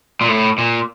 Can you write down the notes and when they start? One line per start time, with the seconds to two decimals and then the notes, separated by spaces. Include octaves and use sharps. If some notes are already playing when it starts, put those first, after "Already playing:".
0.21 A#2
0.28 A2
0.58 A#2